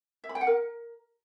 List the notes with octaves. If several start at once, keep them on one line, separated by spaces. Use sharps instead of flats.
E5
B5
G5
F#5
A#4